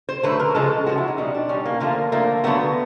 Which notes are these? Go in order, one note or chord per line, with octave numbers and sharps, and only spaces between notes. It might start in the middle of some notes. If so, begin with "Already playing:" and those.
C5
D3 F#3 A3 B4
A#4
C#3 F3 G#3 A4
C#3 F3 G#3 F#4
E4
D#4
B2 G3 D#4
D4
B2 G3 C#4
A#3
D3 F3 A3 A#3
D3 F3 A3 A#3
D3 F#3 A3 B3